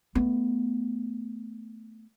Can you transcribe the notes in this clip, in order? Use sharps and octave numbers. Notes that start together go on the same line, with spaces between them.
A3 B3